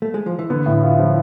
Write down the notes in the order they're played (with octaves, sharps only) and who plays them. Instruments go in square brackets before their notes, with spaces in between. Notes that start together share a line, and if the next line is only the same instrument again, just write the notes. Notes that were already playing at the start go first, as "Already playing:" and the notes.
[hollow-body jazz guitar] A3
G#3
F3
E3
[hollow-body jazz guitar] D3 [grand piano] B3
[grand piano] A2
F4
F3